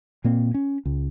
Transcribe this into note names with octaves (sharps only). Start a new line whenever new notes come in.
A#2 A#3 C4
C#4
C#2